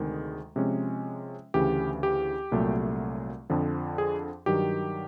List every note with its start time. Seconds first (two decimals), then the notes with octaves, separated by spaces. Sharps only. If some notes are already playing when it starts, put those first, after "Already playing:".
Already playing: D2 C3 D#3 G#3
0.56 C3 F3 G#3 C#4
1.54 D2 C#3 E3 G4
2.03 G4
2.52 C2 A#2 F#3 A3
3.50 F2 D3 F3
3.98 G#4
4.46 G2 D#3 F#3 G4